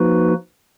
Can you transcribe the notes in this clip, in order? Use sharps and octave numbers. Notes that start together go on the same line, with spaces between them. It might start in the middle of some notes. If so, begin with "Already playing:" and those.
Already playing: F3 A#3 D#4 F#4 B4